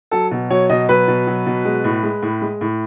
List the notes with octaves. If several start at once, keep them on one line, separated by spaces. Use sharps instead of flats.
F#3 A4
B2
F#3 C#5
B2 D#5
F#3 B4
B2
F#3
B2
G#3
A2
G#3
A2
G#3
A2